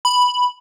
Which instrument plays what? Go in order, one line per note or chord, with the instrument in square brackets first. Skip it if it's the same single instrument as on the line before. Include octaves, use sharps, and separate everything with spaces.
[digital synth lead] B5